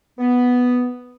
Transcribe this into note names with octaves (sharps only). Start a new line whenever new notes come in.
B3